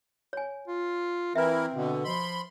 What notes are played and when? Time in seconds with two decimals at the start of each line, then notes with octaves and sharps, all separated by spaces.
0.33 C#5 G#5
0.68 F4
1.35 E3 C4 E4 A#4 B4 E5
1.74 B2 D3
2.04 F3 B5 C6